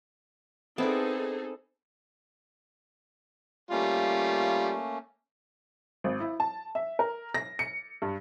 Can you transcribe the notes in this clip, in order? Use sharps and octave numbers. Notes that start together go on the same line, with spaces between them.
B3 C4 D#4 E4 G#4 A4 D5
G3 A3 A#3 C#4 F4
G#1
E4
A5
E5
A#4
A#6
C#7
G2